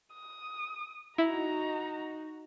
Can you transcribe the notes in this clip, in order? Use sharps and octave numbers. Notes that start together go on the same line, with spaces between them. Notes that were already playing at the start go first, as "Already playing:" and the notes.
D#6
D#4 E4 F#4 A#5